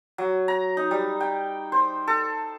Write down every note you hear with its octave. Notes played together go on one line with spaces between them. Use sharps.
F#3
A#5
D#4
G3
G5
C5
A4